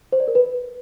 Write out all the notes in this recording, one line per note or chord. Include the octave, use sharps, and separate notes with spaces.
C5
D5
A#4
B4